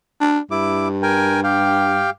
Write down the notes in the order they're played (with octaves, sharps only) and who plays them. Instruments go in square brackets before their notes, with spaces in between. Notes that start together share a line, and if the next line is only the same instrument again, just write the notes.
[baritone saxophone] D4
[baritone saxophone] G2 [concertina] E4 D6
[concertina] A#4 G5 G#5
G4 F5 G5